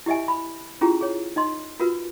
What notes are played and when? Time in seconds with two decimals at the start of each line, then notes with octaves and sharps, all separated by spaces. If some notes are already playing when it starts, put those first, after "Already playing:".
0.06 E4 G4 D#5 E5 G#5
0.28 B5
0.81 C#4 E4 F4 G4 G#4 A#5
1.01 G#4 C#5
1.36 D#4 D#5 C6
1.80 F4 F#4 A#4 B4